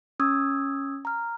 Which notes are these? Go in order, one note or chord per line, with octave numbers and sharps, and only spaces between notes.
C#4 C#6 D#6 E6 G#6
A#5 F6